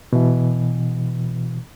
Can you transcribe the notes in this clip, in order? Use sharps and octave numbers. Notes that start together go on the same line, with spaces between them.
B2 E3